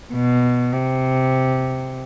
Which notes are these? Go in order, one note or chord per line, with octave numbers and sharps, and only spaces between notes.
B2
C3